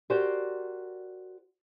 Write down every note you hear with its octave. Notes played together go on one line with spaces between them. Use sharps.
F#4 G4 A#4 C5 D5